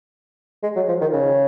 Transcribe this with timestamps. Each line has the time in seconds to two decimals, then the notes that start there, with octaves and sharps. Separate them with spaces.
0.63 G#3
0.76 F#3
0.88 F3
1.01 D#3
1.13 C#3